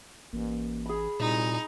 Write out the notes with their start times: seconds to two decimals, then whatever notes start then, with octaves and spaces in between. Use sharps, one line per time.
0.33 A1 A#3
0.86 G#4 B5
1.20 C2 A#2 D#4